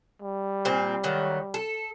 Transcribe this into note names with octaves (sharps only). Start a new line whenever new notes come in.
G3
A#2 C4
D#3 F#3 A3
A4